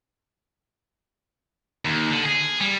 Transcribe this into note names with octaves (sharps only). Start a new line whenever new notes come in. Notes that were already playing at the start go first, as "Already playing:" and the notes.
D#2
D3
G#4
G3